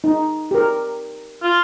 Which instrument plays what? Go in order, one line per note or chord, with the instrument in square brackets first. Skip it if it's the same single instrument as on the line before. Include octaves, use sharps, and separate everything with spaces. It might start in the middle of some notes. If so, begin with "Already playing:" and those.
[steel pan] D#4
G4 A#4
[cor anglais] F4